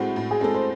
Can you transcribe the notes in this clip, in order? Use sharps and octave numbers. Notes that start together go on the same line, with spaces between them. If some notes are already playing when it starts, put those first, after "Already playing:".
Already playing: A2 G#3 C4 F#4
A2
G#4
G#3 C4 A4
C5